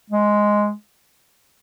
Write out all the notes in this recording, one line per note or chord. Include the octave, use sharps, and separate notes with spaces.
G#3